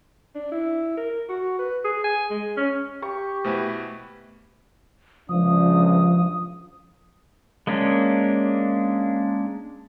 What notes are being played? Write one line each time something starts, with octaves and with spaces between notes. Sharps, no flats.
D4
E4
A#4
F#4
B4
G#4
G#5
G#3
C#4
G4 C#6
B2 A3 E4 B4 C5 G#5
C#2 C3 F3 D4 D#6
G#3 A#3 C#4 D4